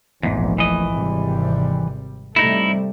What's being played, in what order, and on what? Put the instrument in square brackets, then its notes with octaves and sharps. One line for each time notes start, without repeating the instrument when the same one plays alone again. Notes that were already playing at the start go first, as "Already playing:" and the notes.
[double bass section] F1 A#1 [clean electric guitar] E2 G#2
[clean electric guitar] E3 D#5
[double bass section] G#1 C3 G3
[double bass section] C3 G3 A3 [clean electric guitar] D#4 E4